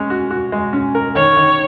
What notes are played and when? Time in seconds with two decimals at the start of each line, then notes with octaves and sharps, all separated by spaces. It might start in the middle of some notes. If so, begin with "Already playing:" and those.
Already playing: G#3 C#4
0.10 F#4
0.31 F#4
0.52 G#3
0.73 C#4
0.95 A#4
1.15 D#3 C#5
1.37 D#3